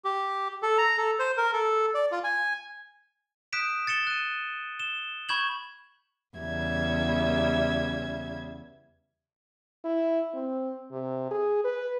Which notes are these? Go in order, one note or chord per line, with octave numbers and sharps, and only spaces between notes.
G4
A4
A#5
A4
C5
A#4
A4
D5
F4
G#5
D#6 F#6 G6 B6 D7 E7
A6 C#7 E7 G7
F#6 D#7
E7 G7
B5 C#6 G6 G#6 E7 F#7
E2 C#3 G3 E5 G#6
E4
C4
C3
G#4
B4